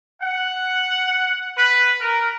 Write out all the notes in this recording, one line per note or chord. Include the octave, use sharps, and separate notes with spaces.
F#5
B4
A#4